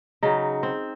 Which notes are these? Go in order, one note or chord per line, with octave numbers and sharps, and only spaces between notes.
C#3 F#3 D#4
C4